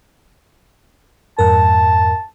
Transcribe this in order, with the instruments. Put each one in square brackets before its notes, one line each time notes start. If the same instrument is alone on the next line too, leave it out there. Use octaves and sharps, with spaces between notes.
[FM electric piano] F2 G#2 A#4 [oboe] A5